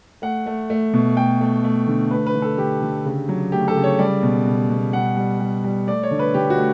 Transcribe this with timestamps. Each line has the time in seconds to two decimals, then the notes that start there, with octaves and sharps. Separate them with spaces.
0.22 A3 F#5
0.46 A3
0.70 A3
0.94 B2
1.17 A3 G5
1.41 A3
1.64 A3
1.87 D3
2.11 A3 B4
2.27 B4
2.34 D3
2.42 A4
2.58 D3 G4
2.82 D3
3.05 C#3
3.29 F#3
3.52 A3 G4
3.68 A4
3.76 C#3
3.84 C#5
3.99 G3 D5
4.23 B2
4.46 B2
4.70 B2
4.93 G3 F#5
5.17 G3
5.40 G3
5.64 G3
5.87 A3 D5
6.03 C#5
6.11 D3
6.19 B4
6.34 D3 G4
6.50 F#4
6.58 A3